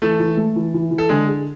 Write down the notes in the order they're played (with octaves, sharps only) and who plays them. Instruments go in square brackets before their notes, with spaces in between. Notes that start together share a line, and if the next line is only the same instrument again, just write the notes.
[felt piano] E3 [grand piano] A3 A4
[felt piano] E3
A3
E3
E3
E3
[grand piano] A4
[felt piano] D3 [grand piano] G#3 G#4
[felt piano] G#4